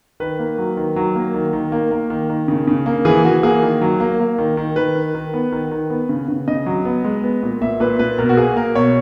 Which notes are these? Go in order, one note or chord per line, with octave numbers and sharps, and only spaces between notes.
D#3 B4
A#3
F#3
D#3
F#3
A#3
D#3
D#3
A#3
A#3
D#3
D#3
C#3
C#3
A#3
E3 G#4
E3 F#4
A#3 G#4
D#3
F#3
A#3
A#3
D#3
D#3
D#3 B4
D#3
D#3
B3
D#3
D#3
B3
C#3
C#3
C#3 D#5
F#3
B3
G#3
B3
A#2
A#2 E5
A#2 B4
A#2 B4
B2 A#4
F#4
A#3 G#4
A#3 A#4
B2 C#5